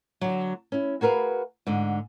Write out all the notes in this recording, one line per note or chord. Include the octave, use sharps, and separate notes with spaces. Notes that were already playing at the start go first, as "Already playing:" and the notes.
D3 F#3
C#4 E4
F#4 G#4 A#4 B4 F5
G#2 D3